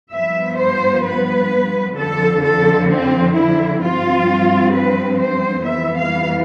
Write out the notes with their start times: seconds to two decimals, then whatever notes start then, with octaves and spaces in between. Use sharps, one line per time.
0.12 G2 F3 B3 E5
0.59 C5
1.04 B4
1.97 F2 D3 F3 A4
2.43 A4
2.90 C4
3.35 E4
3.82 G2 F3 C4 F4
4.74 B4
5.21 C5
5.66 F2 E3 G3 B3 E5
5.97 F5